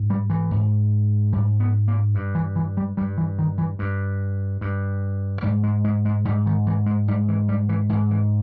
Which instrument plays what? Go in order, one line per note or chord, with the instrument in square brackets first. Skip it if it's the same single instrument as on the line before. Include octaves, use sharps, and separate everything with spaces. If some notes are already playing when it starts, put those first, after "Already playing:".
Already playing: [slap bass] G#2
G3
E3
G#2
G#2 G3
B3
A#3
G2
E3
E3
G3
G2 G3
E3
D#3
E3
G2
G2
G#2 G3
G#3
G#3
G#3
G#2 G3
D#3
E3
G#3
G#2 G3
E3
G3
E3
G#2 E3
E3